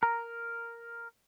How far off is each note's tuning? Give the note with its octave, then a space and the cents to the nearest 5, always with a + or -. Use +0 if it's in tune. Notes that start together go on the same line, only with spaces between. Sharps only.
A#4 +0 A#5 +0